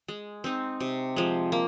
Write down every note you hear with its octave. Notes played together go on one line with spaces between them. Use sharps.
G#3
C4 D#4
C3
F3 G#3
A#3